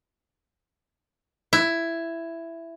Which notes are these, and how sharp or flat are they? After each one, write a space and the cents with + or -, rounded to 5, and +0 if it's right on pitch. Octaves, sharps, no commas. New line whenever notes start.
E4 +10